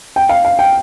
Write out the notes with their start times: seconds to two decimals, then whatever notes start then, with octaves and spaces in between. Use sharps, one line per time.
0.16 G5
0.29 F5
0.45 F5
0.59 G5